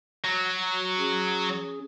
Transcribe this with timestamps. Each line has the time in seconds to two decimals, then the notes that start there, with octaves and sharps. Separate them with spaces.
0.25 F#3
0.99 C#4 G#4